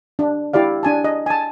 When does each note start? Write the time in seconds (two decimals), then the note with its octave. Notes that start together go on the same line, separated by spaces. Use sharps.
0.19 D4
0.53 E4 G4 D5 F5
0.83 D4 G#5 A5
1.04 D#5
1.26 G#5 A5